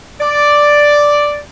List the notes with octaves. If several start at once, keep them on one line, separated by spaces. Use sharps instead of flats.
D5